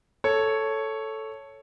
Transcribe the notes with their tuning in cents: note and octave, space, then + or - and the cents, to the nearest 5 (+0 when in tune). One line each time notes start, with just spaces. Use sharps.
A4 +0 C#5 +0